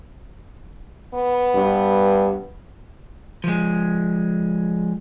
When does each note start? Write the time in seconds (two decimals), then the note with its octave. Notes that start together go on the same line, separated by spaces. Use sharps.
1.14 B3
1.54 G2
3.44 F3 G#3